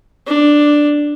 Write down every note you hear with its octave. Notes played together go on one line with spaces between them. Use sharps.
D4